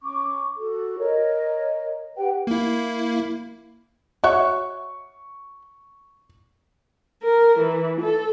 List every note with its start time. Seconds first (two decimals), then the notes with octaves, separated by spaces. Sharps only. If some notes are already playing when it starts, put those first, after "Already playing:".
0.01 C#4 C#6 D6
0.57 F#4 A4
0.98 A#4 C#5 D#5
2.16 G4 B4 F#5 G5
2.47 A#3 E4
4.24 F#4 C#5 E5 C#6
7.23 A#4
7.59 E3
8.00 A4